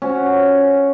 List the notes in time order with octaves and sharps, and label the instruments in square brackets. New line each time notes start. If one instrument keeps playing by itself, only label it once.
[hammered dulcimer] C#4 F#4